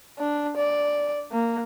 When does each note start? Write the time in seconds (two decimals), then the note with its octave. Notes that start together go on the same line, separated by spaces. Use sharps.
0.19 D4
0.57 D5
1.32 A#3